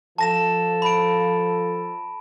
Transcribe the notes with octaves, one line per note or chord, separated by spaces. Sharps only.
F3 A4 A5 A#6 E7
B5 D7